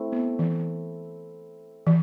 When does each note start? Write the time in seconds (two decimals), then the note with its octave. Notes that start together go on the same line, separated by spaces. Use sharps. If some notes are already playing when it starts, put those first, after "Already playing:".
Already playing: A3 C4 E4 A4
0.12 B3
0.39 E3
1.87 E3